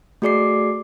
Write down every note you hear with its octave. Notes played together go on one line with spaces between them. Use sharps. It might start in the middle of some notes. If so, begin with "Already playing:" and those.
A3 F#4 G#4 D5 D6 C7